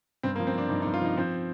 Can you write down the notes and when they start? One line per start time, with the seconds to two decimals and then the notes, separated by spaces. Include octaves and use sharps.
0.23 G2 C4
0.36 A#3
0.39 F3
0.47 C4
0.54 F3 D4
0.70 G2 D#4
0.82 D#4
0.86 G2
0.94 F4
1.01 F3 D#4
1.17 F3 C4